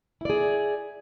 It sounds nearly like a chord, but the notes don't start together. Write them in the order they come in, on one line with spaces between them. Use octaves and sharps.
E4 D5 G#4